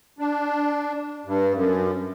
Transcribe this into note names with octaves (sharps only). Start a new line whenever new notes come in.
D4
G2
F#2